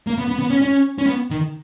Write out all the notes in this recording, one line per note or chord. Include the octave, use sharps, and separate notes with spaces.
A#3
B3
B3
B3
C#4
C#4
C#4
B3
D#3